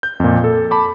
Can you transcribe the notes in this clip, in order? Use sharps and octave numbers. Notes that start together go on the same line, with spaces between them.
G6
F2 A#2
A4
A5 B5 D6